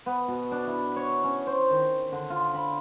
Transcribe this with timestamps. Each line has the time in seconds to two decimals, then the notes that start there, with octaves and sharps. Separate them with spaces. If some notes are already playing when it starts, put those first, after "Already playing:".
0.06 B3
0.28 B2
0.51 D4
0.67 E4
0.96 C#5
1.24 C#4
1.47 C5
1.71 D#3
2.12 D3
2.30 F4
2.54 B5